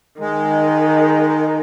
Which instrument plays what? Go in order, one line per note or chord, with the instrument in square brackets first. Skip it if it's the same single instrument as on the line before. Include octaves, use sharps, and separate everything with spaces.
[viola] D#3 [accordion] G#3